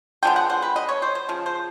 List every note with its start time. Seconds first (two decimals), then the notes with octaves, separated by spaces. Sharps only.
0.23 D3 F3 G#3 B3 G5
0.36 F#5
0.50 C5
0.62 B4
0.76 D#5
0.89 C#5
1.02 C5
1.15 C5
1.29 C#3 F3
1.46 C5